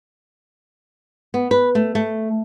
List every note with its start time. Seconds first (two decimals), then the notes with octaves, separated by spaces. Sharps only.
1.34 B3
1.51 B4
1.75 A3
1.95 A3